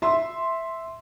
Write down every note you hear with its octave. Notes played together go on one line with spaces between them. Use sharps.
E5 C6